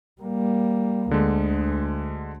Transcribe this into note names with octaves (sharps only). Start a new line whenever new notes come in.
G3 A#3
D2 D3 G#3